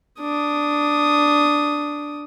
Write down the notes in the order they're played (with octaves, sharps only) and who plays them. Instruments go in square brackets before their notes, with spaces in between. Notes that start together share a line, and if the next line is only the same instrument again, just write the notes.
[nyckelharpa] D4 D#6